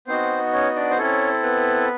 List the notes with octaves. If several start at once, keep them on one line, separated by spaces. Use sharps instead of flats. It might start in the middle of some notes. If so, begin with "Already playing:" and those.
B3 C4 D#4 F#4 C5
C#4 C#5
D4 D5
C5
C4 C#4 E4 A4 C#5
B3 B4